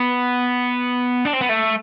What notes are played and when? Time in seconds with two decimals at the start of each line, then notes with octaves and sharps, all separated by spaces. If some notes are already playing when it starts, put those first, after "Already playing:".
Already playing: B3
1.25 D4
1.33 C4
1.41 B3
1.49 A3